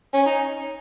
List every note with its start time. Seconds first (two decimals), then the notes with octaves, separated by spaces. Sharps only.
0.13 C#4
0.25 D#4